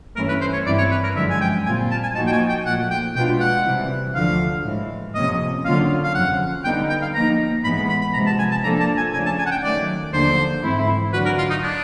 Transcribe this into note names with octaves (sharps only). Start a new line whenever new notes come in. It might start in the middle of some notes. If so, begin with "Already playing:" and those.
G2 E3 A3 C#4 E4 A#4
B4
C5
C#5
G2 E3 G3 C4 E4 D5
C#5
B4
A#4
F#2 D3 F3 G#3 E5
G#5
G5
A#2 G3 C4 F4 G#5
A5
G#5
A#2 F3 A#3 D#4 F#4 A5
G5
G#5
G5
A#2 F3 A3 F#5
G5
B2 G#3 B3 D4 F4 G5
F#5
C3 E3 G3
D2 D3 F3 A3 F5
A2 E3 G#3
F2 C3 F3 A#3 C#4 D#5
D3 F#3 A#3 C#4 F4 F5
F5
F2 C#3 F3 F#5
D3 G3 B3 D#4 G5
G5
F5
F3 A#3 D#4 A#5
A2 E3 G#3 B3 B5
B5
B5
B5
C3 F3 G#3 B3 A#5
A5
G#5
A5
F3 A#3 D4 F4 A4 A#5
A5
G#5
C#3 F3 A3 D4 G#5
A5
G#5
F#5
G5
D#3 F#3 A3 D5
D#2 D3 F3 A#3 D4 C5
G#2 E3 A3 C4 E4
D3 F#3 A3 D4 F#4 B4
A#4
F4
D#4
D4